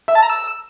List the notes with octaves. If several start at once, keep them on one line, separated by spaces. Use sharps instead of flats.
E5
A5
A#5
E6